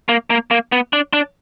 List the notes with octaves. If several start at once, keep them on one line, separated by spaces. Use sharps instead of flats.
A#3
A#3
A#3
B3
D4
D4